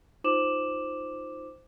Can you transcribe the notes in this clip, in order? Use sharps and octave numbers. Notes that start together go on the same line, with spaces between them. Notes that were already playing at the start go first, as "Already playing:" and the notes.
D#4 F4 C5 D6 E7 F#7